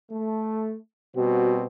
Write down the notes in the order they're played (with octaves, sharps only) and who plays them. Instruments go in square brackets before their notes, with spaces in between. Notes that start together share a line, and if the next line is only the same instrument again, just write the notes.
[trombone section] A3
[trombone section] B2 G3 C4 [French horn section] F#4